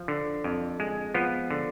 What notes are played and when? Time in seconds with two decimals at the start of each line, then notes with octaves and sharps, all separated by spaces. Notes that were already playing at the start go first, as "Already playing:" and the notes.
Already playing: F3
0.08 D3
0.44 F2
0.80 G#3
1.14 F3 B3
1.51 D3